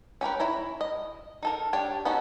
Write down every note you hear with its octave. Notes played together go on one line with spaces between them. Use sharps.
C#4 G4 A#4 B4
E4 C#5 A#5
D#5
D#4 A4 A#4
D4 G4 C#5
B3 C#4 D#4 F#4 A4